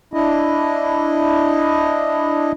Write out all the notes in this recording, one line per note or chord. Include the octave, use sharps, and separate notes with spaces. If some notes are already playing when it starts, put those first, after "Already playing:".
D4 E4 D#5